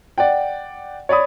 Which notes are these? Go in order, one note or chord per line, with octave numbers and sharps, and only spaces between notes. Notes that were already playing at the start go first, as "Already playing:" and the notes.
D5 F#5 G5
C#5 D5 B5 D#6